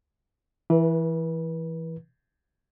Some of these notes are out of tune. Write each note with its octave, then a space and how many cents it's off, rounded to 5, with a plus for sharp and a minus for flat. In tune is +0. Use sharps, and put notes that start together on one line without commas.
E3 +0 B4 -30